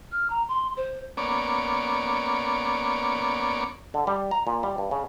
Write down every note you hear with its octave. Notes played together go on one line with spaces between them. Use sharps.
F6
A#5
C6
C5
A#3 B3 C#4 C#5 D5 D6
D3
G3
A#5
A#2
G3
G2
C#3